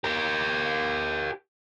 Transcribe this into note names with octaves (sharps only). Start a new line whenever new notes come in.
G4 A#4